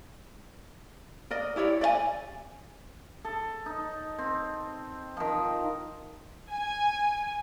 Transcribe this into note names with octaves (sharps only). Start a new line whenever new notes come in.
A#4 D5 D#5
E4 G4 C#5 D5
D5 D#5 G#5
A4
D#4
C4
D#3 F3
G#5